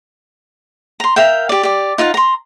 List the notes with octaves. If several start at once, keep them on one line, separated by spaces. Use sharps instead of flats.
A#5 C6
A#4 E5 F5 G5
G4 D5
G4 D5
D#4 F4 F5 F#5
A#5 C6